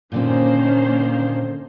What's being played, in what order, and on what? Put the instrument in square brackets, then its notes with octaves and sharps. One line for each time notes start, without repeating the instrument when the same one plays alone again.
[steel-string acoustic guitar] A#2 D3 C4 [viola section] D#3 A#3 C5 [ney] C#4